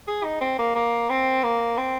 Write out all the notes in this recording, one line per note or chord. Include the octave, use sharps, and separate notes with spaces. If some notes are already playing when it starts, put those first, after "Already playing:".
G#4
D#4
C4
A#3
A#3
C4
A#3
C4